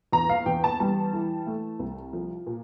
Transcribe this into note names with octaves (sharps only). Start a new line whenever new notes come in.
E2 A#5
F5
E2 G5
A5
G3 A5
E3
A3
C2
F3
A#2